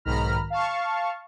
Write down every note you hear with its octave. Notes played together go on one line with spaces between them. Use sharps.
B1 G#2 D#3 A#5 B5 F6
F5 A5 C#6